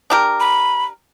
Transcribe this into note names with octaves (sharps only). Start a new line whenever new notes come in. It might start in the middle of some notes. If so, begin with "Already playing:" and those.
D4 G4 A#4
B5